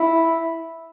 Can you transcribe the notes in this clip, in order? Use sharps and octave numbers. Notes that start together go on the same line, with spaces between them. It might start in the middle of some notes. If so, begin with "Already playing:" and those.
Already playing: E4